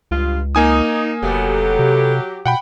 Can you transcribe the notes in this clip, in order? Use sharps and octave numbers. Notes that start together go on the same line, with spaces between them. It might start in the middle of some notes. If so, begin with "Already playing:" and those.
C#2 G2 F4
A#3 D#4 G#5 D#6
F1 F#3 A3 B3 G4
C3
B2 F#5 G5 B5